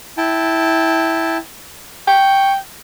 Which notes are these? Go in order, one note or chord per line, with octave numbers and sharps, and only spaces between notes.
E4 G5 A5
G5 C#6